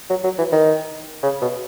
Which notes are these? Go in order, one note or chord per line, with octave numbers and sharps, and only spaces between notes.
F#3
F#3
E3
D#3
C#3
B2